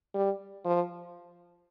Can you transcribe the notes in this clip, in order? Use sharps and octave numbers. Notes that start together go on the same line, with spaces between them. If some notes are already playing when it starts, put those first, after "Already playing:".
G3
F3